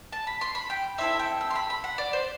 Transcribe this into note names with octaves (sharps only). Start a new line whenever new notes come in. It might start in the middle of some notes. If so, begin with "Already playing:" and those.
A5
B5
C6
B5
G5
C4 E4 A4 E5
G5
E6
C6
B5
B5
F#5
D5
C5